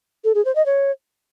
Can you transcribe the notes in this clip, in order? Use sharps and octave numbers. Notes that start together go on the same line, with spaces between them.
A4
G#4
C5
D#5
C#5